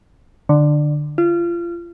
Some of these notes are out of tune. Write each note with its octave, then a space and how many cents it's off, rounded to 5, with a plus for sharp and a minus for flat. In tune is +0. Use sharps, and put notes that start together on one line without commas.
D3 +15
F4 -30